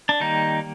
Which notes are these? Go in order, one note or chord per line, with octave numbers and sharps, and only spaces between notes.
D4
D#3 G3 A#3 D#4